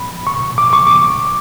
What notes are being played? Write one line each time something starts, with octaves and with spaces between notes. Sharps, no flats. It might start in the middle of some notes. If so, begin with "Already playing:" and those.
Already playing: B5
C#6
D6
C#6
D6